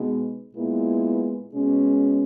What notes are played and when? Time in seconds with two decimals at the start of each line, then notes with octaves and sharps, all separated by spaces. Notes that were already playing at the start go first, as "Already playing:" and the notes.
Already playing: B2 G#3 B3 D#4
0.54 A#2 G#3 B3 E4
1.53 B2 G#3 C#4